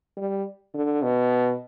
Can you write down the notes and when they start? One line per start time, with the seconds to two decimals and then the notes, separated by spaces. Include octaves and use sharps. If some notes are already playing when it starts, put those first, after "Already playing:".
0.17 G3
0.74 D3
1.03 B2